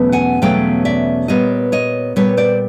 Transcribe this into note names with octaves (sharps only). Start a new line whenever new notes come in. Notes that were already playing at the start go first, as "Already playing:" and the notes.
Already playing: E2 B2 F#3 A3 C#4
F#5 G#5
E2 B2 F#3 A3 C#4 F5 G5
D5 E5
A#2 G3 B3 C#5 D#5
C#5 D#5
A#2 G3 B3 B4 C#5
C5 D5